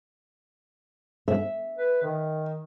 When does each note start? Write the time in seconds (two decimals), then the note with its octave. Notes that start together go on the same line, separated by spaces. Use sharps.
1.28 E5
1.78 B4
2.02 D#3